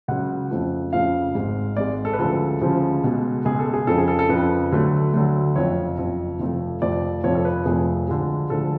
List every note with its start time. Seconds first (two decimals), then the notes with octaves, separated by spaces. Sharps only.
0.08 C#2 C#3 F#3 F#5
0.51 F2 C#3 F3 A3
0.93 F2 C#3 F3 A3 F5
1.34 G#1 G#2 G#3
1.77 G#1 G#2 G#3 D5
2.05 A4
2.13 B4
2.19 D2 C#3 F3 G#3 A4
2.61 D2 C#3 F3 G#3
3.04 C#2 B2 G#3
3.45 C#2 B2 G#3 G#4
3.59 A4
3.74 G#4
3.87 F2 C#3 F3 A4
3.98 G#4
4.08 A4
4.19 A4
4.29 F2 C#3 F3 B4
4.72 D2 D3 F#3 A3
5.13 D2 D3 F#3 A3
5.55 F#1 F2 F3 C#5
5.98 F#1 F2 F3
6.40 F1 F2 F3 A3
6.82 F1 F2 F3 A3 D5
7.24 F1 F2 F3 A3 C#5
7.35 A4
7.45 B4
7.66 F1 F2 F3 A3 G#4
8.08 D2 D3 F3 G#3
8.50 D2 D3 F3 G#3 A4